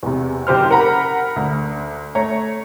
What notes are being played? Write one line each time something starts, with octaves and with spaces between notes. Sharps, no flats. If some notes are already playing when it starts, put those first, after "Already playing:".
E2 C3
F#1 G4 C5 F6
A#4 F#5 A#5 B5
D2
A3 C#5 A#5